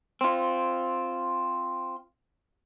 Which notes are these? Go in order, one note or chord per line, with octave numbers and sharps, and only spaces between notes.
C4 F4